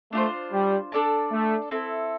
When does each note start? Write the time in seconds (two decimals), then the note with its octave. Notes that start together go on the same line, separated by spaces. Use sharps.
0.12 A3 D4 F4 C5
0.52 G3
0.92 D4 A4 D5 A5
1.31 A3
1.71 C4 E4 A4